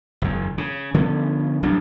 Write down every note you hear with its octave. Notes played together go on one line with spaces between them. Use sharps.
F#1 E2
C#3
D3 F3 B3 C#4
A1 F#3 G3 D4